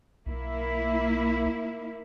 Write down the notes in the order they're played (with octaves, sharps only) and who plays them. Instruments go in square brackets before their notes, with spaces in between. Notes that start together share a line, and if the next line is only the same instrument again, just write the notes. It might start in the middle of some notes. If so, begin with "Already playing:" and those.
[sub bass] B1 [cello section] A#3 E4